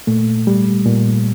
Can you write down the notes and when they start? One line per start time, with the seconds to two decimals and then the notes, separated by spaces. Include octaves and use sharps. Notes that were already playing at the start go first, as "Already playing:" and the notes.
0.07 A#2 A3
0.47 G3
0.86 A#2